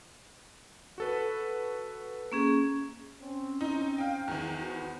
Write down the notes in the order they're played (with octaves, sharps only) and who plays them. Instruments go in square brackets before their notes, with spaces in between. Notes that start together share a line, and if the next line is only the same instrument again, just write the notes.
[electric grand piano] F#4 A4 B4
[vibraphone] A#3 C#4 G#4
[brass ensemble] C4 C#4
[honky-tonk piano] D#4
F5 G5
E2 D#3
[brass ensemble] B3 C4 F#4